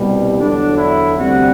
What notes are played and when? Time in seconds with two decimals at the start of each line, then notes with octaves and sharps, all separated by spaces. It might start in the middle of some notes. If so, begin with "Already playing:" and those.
Already playing: C2 B2 G3
0.38 E2 D3 F#3 D4
0.77 E4
1.17 D2 C3 G3 F#4